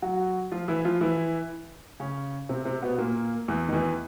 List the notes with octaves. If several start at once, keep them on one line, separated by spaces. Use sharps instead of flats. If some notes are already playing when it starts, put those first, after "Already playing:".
F#3 F#4
F3 F4
E3 E4
F3 F4
E3 E4
C#3 C#4
C3 C4
C3 C4
B2 B3
A#2 A#3
E2 E3
D#3
E2 E3